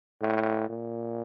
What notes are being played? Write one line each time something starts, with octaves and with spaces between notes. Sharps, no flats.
A2
A#2